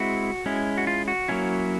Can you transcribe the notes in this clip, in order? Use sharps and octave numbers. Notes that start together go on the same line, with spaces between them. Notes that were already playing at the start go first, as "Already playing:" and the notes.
Already playing: G#3 C4 E4 F#4
G#3 C#4 E4
F#4
F4
F#4
F#3 A#3 C#4 E4